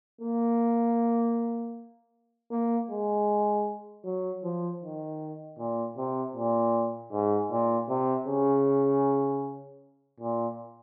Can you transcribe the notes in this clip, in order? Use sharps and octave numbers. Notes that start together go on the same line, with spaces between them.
A#3
A#3
G#3
F#3
F3
D#3
A#2
C3
A#2
G#2
A#2
C3
C#3
A#2